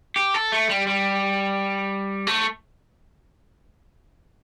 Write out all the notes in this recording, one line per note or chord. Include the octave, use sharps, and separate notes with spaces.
G4
A4
A3
G3
G3
A3